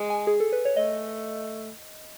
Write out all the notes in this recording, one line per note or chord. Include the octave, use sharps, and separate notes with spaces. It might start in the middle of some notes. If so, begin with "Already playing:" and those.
Already playing: G#3
G#5
G#4
A4
B4
C#5
A3 D#5